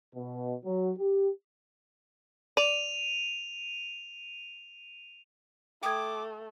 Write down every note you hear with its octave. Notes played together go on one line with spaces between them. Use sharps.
B2
F#3
G4
D5 D#7 F7
A3 G5 D6 D#6 G#6